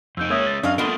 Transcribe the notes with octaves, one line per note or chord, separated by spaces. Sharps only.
F2 D#4 E6 G6 D7
G#3 A#3 C#4 C#5 E5 D#6 E6 G#6
A6
F#2 C#4 D4 D#5 F5
A#3 B3 F4 A4 A#4 D#5 D7 G7